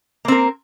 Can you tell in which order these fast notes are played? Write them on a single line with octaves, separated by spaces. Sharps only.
A#3 C4 A#4